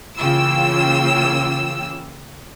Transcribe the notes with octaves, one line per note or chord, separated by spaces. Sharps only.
C#3 E3 A#3 F4 G5 E6